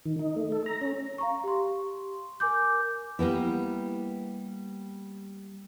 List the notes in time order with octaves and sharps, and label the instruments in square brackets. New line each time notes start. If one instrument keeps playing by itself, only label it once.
[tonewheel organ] D#3
D#4
A3
A4
A#5
C#4
[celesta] F5 A#5 C#6
G4 C6
A#4 G#5 D6 G6
[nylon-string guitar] G3 A#3 B3 E4